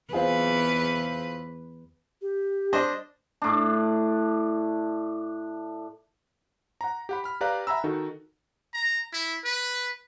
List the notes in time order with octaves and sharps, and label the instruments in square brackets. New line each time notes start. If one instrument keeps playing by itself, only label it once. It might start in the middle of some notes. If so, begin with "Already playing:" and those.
[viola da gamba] E2 B4 [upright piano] C4 F4 G#4
[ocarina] G4
[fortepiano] D4 C5 D#5
[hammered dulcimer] A2 D4
[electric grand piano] F#5 A#5
G4 F#5 B5
B5 F6
G4 B4 D5 F5 A#5 F#6
E5 F#5 G#5 A#5 B5 E6
D#3 D#4 F#4 A4
[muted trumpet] A#5
E4
B4